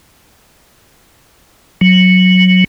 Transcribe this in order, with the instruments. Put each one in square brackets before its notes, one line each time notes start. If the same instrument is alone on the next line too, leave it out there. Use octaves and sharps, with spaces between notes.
[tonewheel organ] F#3